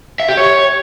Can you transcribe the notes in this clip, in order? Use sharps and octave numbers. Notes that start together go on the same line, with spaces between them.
E5
G4
C#5